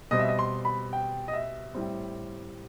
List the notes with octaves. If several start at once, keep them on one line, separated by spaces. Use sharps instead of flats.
B2 G3 C4 D#5
E5
D#5
C6
B5
G5
D#5
E5
A2 G3 C4